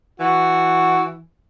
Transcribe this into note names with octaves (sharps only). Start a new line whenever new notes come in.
E3 F#4